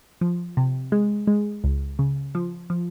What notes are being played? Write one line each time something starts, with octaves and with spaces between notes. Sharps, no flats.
F3
C3
G#3
G#3
C#2
C#3
F3
F3